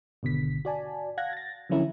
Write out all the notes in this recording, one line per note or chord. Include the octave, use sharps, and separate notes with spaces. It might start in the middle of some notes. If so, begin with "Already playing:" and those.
G#1 B2 D3 B6
F#4 D5 G#5 A5
F5 F#5 F#6 G#6 A#6
A6 A#6
D3 F3 F#3 C#4 E4 A#4